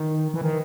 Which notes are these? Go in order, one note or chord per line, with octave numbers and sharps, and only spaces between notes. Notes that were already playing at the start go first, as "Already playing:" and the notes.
Already playing: D#3
E3
D#3